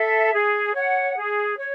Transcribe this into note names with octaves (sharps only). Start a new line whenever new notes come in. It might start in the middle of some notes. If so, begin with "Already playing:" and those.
Already playing: A4 E5
G#4
C#5 F#5
G#4
C#5